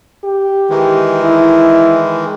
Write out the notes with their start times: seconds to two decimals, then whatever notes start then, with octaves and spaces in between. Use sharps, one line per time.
0.24 G4
0.70 D#3 E3 G#3
1.22 E4